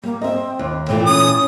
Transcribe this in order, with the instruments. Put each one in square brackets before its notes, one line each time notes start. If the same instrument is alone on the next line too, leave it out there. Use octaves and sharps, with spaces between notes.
[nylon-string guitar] G3 [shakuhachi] A#3
[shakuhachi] C4 [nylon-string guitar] D#5 E5
[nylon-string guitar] D#2
[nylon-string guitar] A#2 E3 A3 [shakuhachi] G5
[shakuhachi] C#4 [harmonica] D#6